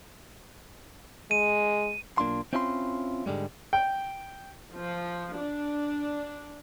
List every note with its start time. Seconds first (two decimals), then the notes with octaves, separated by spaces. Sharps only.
1.31 G#3 D#7
2.18 B1 A#3 D4 F4 C6
2.53 C4 C#4 E4 F4 F#5 C6
3.26 G#2 D3 G3 G#3
3.73 G5
4.78 F3
5.36 D4